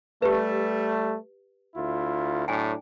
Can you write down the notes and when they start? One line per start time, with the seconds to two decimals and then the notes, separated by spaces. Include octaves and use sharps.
0.22 G3 A3 G4 B4
1.75 D2 E4 F4
2.48 A2 F#3 D4 G5 G#5